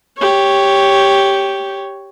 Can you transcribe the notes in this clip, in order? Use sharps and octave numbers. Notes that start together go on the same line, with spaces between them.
G4 C#5